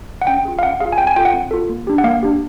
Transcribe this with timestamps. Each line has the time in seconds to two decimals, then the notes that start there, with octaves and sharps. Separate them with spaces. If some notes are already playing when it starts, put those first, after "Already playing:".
0.22 F#5
0.27 C#4 G5
0.45 F4 G#4
0.59 F5
0.63 C#4 F#5
0.80 F4 G#4 F5
0.92 G#5
0.98 C4 G5
1.07 G#5
1.16 F4 A4 G5
1.25 F#5
1.34 C4
1.51 F4 A4
1.69 A#3
1.87 D4 G4
1.98 F#5
2.04 A#3 F5
2.23 D4 G4